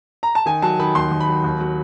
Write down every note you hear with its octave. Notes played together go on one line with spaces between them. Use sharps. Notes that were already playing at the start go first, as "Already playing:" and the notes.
A#5
A5
D#3 G#5
F#3 A5
D#3 B5
D#2 C6
D#2
B5
F#3
D#2
F#3